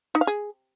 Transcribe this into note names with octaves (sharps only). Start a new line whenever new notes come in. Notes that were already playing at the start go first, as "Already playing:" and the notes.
D#4
F5
G#4